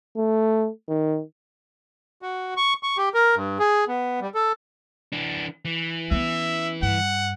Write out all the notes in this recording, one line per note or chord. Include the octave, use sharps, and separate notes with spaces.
A3
D#3
F#4
C#6
C#6
G4
A#4
G2
G#4
B3
G3
A4
E3 D4
E3
B3 C#4 E5
G2 F#5